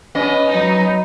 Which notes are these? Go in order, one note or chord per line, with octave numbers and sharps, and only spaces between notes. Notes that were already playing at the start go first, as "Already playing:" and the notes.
B3 C#4 D#5
F#3 D#4